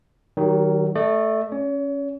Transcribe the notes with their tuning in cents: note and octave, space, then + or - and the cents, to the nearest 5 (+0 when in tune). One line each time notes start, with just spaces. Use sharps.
D#3 +0 F#3 +35 G4 +0
A3 +0 D5 +45
C#4 +0 C#5 +35